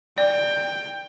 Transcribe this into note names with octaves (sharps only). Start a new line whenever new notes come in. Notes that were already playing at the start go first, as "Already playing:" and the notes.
D5 G5